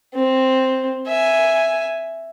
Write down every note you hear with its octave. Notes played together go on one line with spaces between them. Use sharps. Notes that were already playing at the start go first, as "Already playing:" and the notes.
C4
E5 G#5